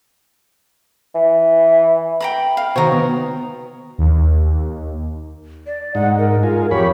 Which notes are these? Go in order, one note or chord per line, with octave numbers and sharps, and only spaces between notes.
E3
G5 A#5 B5
F5
D#3 F#4 C5 C#5 A#5
B3
D#2
D5
G#2 D#4 F#5
A#4
F4 G#4
F2 G4 C#5 B5